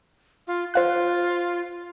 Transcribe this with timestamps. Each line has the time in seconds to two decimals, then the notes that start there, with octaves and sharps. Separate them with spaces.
0.47 F4
0.74 F4 C5 F5 F#6